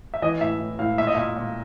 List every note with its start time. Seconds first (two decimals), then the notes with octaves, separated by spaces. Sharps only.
0.14 E5
0.22 E3 D#5
0.41 A2 E5
0.60 A2
0.79 A2 F5
0.98 A#2 E5
1.07 D#5
1.15 A#2 E5
1.36 A#2